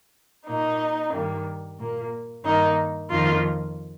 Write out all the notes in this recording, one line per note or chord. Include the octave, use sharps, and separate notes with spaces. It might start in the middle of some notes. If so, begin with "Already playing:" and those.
A#2 A#3 D#4
G2 D#3 G3 A#3
A#2 A#3
G2 D#3 A#3 D#4
F2 D#3 A#3 F4